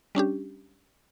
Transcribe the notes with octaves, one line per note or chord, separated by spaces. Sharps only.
G3 C#4 D4 G4